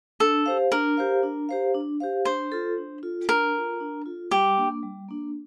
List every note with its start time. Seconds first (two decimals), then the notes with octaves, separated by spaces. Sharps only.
0.20 D4 A4
0.46 G4 C5 F5
0.72 D4 A#4
0.97 G4 C5 F5
1.23 D4
1.49 G4 C5 F5
1.74 D4
2.00 G4 C5 F5
2.25 D4 C5
2.52 F4 A4
2.78 D4
3.03 F4 A4
3.28 D4 A#4
3.54 F4 A4
3.80 D4
4.06 F4 A4
4.31 G3 G4
4.57 A#3 D4
4.83 G3
5.09 A#3 D4